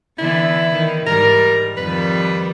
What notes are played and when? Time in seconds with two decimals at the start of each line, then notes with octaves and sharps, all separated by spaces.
0.19 D3 E3 B3 E4
0.71 D#3
1.07 G#2 G3 A#4
1.77 F2 D#3 G3 B4